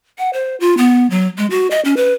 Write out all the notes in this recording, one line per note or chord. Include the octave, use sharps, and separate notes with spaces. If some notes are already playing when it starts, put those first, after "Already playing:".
F#5
C5
F4
B3
F#3
G#3
F#4
D#5
C#4
B4